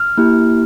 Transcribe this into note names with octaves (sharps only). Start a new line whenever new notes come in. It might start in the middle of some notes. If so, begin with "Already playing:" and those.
Already playing: F6
A#3 E4 G4